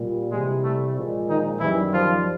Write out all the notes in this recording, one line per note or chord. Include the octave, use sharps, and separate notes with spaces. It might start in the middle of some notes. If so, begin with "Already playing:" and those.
Already playing: A#2 G3
C3 E3 G3 G#3
A3
A#2 F3 G#3
D#3 D#4
F#2 D#3 E3 G3 E4
F3 F4